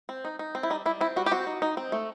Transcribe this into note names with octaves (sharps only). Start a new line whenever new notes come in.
C4
D#4
D#4
C4
E4
G3 D#4
G3 E4
C4 E4
G3 F#4
G4
C4 F#4
D#4
D#4
C4
A3